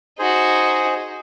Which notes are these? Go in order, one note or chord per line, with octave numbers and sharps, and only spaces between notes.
D#4 F#4 G#4 C5